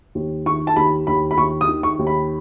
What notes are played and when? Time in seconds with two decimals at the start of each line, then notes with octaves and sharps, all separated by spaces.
0.15 D#2
0.46 D#3 C#6
0.67 A5
0.76 D#2 B5
1.07 D#2 B5
1.31 B5
1.37 D#2 C#6
1.61 D#6
1.68 D#3
1.83 C#6
1.99 D#2
2.07 B5